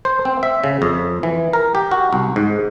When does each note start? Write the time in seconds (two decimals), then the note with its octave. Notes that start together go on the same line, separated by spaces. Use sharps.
0.05 C5
0.25 C4
0.43 E5
0.64 C#3
0.82 F2
1.23 E3
1.53 A#4
1.75 G4
1.91 F#4
2.13 C2
2.36 G#2